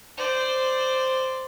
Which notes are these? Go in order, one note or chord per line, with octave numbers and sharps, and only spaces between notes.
C5 D5